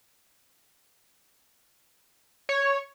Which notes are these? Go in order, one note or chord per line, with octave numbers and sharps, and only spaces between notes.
C#5